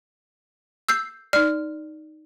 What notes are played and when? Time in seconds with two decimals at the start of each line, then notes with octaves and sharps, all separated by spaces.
0.89 E6 G6 C7
1.33 D#4 D5 F6